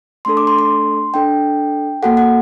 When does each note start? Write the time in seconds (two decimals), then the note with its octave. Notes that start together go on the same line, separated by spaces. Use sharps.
0.25 A3 D4 A4 C6
0.37 D6
0.47 C6
0.59 C6
1.14 D4 A4 G5
2.03 A#3 F#4 A4 F#5
2.17 F#5